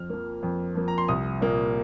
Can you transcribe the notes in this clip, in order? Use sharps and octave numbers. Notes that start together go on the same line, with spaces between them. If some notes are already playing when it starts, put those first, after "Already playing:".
Already playing: F2 F6
F3 A#3
F2
F3 A#3
A#5
C6
C2 D#6
A#2 A#3